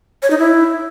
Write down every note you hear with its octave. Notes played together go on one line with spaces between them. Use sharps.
C#5
D#4
E4